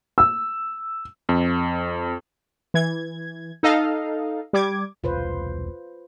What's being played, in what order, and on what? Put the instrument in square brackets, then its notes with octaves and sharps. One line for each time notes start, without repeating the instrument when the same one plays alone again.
[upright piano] E6
[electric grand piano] F2
[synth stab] E3 G#6
D#4 A4 D#5 F5
G3 D6 G#6
[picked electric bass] E1 C2 [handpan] F4 B4 C5